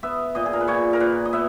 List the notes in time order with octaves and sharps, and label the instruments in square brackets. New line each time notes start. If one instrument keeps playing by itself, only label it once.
[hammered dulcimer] B3 E5
A#2 D#5
G#4
A#4
B4
A#2 C#5
A#4
A#2 B4
D#5
B3 E5